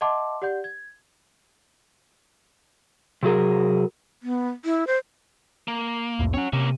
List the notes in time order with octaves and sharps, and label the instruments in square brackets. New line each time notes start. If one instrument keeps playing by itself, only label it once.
[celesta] D#5 E5 F#5 A5 C6 D6
G4 D5 F#5 G6
G#6
[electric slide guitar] C3 F#3 G#4 A#4
[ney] B3
E4
C5
[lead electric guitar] A#3
[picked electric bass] C2 F2 A2
[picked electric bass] C4 C#4 [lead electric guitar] C#5 F#5
[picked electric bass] C3 [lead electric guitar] A#3 C#4